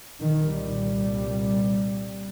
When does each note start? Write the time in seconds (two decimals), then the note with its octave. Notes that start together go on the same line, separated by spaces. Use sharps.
0.22 C2 A#2 D#3
0.53 G3